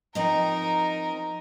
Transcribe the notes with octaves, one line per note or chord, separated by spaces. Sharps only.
F3 C4 D#4 A#4 D#5